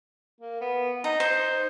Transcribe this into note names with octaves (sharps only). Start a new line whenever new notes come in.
A#3
B3
D#4 A#5
D#4 C5